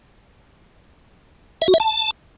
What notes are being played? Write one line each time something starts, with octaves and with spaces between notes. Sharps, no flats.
E5
F#4
E5
A5